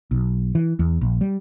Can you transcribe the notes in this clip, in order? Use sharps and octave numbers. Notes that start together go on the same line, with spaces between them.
B1
E3
E2
A#1
G3